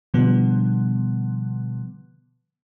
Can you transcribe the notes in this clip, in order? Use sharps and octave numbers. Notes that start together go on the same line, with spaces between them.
B2 D3 F3 G3 B3